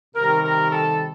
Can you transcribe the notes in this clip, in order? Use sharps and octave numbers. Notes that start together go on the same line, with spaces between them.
C3 D#3 G3 A#4
A#4
A4